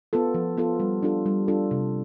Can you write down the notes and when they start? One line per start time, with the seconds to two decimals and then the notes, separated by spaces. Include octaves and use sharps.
0.13 B3 F4 A4
0.34 F3
0.57 B3 F4 A4
0.80 G3
1.02 D4 F4 A4
1.26 G3
1.48 D4 F4 A4
1.71 C3